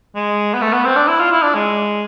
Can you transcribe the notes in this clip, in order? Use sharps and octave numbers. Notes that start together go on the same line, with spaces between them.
G#3
B3
A3
B3
C4
D4
E4
F4
E4
D4
G#3